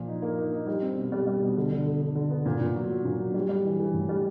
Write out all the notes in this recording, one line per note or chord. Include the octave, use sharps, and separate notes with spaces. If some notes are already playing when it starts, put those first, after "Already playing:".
Already playing: A#2 F3
D#4
A#3
D#4
D#4
G3
C4
B2
G3
G3
B2
D3
D3
D3
D3
D3
B3
A#2
A#2
F#3
F#3
A#2
F#3
G3
G3
E3
E3
A2
G3